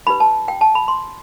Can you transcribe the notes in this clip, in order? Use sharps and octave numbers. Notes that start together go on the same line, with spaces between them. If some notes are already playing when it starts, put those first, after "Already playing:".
D#4 G4 B4 B5
A5
G5
A5
B5
C6